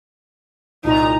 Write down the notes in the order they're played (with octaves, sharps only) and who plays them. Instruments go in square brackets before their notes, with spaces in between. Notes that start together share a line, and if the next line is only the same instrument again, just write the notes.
[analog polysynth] C2 A#2 A#5 [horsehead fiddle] D#4